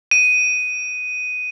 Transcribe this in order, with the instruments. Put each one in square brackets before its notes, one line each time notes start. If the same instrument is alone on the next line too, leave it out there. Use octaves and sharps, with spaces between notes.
[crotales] D#7